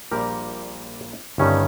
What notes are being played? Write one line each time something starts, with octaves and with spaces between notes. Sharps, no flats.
A#1 A#2 G3 A#3 G4 A#4
G1 G2 D#3 G3 C#4